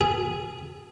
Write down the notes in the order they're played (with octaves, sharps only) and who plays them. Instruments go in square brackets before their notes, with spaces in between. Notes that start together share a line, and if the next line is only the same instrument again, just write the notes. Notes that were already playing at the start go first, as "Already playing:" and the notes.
[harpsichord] G#4